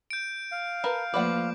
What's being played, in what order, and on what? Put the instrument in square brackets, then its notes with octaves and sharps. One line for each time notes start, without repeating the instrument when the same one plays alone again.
[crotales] G6 D7
[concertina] F5
[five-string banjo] A#4 B4 A5
[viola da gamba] F3 A3 A#3 [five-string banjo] B4 D5 F#5 [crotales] D6